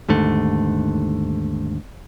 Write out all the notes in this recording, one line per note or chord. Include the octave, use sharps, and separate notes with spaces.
D#2 G#2 D3 A3